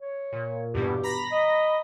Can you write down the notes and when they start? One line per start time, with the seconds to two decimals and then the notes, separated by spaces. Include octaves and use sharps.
0.01 C#5
0.32 A#2
0.74 E2 G2 B2 G4
1.03 A#5 B5 A#6
1.32 D#5